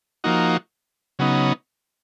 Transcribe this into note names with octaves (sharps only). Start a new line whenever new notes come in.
F3 A#3 D#4 F#4
C#3 F#3 B3 D#4